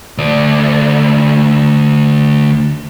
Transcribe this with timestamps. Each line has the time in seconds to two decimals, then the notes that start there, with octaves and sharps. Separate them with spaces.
0.18 D2 D5